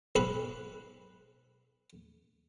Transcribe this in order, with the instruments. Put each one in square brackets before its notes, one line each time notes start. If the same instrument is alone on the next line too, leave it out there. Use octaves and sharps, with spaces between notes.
[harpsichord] B1 G#2 B4 B5